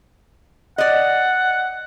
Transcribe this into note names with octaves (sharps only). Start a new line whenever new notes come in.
D5 D#5 F#5